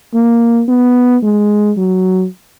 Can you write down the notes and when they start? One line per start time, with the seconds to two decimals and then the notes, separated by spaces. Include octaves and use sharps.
0.14 A#3
0.68 B3
1.23 G#3
1.77 F#3